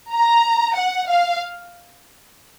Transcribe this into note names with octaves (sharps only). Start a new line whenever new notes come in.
A#5
F#5
F5